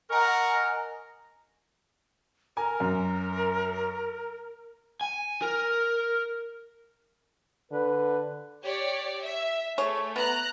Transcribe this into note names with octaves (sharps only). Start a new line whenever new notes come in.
A#4 D#5 F#5 G#5 A#5 C#6
A#4 G#5 A#5
F#2
G#5
A#4
D3 B4
G4 C#5 D5
E5
A3 G#4 C#5
B3 A#5 F#6